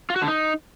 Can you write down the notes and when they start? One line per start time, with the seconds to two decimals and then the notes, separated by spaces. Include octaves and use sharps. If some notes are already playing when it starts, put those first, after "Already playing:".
0.10 F4
0.16 F#4
0.22 D3
0.28 D#4